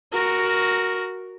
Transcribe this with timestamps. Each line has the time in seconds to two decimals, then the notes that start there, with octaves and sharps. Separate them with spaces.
0.13 F#4 A#4